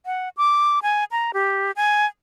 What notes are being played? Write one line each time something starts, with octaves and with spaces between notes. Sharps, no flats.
F#5
D6
G#5
A#5
G4
G#5